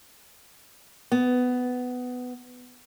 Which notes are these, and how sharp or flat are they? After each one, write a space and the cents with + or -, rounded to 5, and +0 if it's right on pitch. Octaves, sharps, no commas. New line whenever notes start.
B3 +15